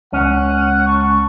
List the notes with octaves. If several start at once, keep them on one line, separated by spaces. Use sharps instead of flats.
C#2 C#4 F#5
A5 C#6